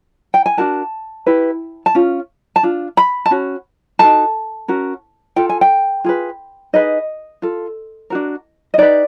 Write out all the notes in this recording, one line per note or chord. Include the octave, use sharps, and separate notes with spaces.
G5
G#5
D4 F#4 A#4 A5
E4 G4 B4
A5
C#4 F4
A5
D4 F4
B5
A5
C#4 F#4
D#4 F#4 A4 A5
C#4 F#4 A#4
F4 A4 G5
G#5
G5
F4 G#4 B4
D#4 G#4 B4 D#5
F4 A4
D4 F#4 A#4
D#5
D#4 G4 B4 D5